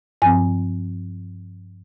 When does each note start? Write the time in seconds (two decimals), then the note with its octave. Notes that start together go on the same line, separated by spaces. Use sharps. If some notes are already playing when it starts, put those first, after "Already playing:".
0.22 G2 F3 C4 G#5